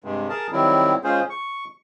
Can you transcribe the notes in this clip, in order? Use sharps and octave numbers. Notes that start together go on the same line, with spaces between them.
G2 C3 G#3
G#4 A#4 A5
D#3 F#3 G3 C4 E4
G#3 C#4 F4 G#4 C5
C#6